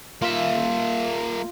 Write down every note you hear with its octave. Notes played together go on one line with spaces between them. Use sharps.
A#3 F4 E5